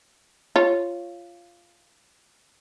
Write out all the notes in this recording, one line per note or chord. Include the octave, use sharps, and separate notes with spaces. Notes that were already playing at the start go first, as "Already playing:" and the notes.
F4 C#5